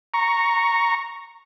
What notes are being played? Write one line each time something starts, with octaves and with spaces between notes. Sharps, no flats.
A#5 C#6